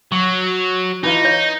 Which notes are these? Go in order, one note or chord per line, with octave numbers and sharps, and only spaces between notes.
F#3 C#6
E3 D#4 F4
C#5 G6